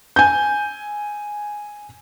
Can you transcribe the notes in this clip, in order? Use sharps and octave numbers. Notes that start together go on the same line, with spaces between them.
G#5 G6